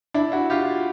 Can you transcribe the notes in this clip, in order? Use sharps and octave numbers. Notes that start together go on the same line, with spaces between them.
D4 E4
E4 F#4
F4 G4